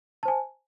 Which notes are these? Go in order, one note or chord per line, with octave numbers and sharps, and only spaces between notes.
C5 G#5 A5